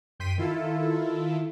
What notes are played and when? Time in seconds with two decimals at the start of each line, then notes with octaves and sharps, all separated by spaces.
0.20 F#2 G5 C6 B6 D#7
0.38 D#3 E4 F4 A4